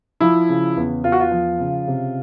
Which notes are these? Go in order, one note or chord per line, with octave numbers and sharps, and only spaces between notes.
F3 E4
C#3
E2
E2 F4
F#4
F4
F3
C#3
C3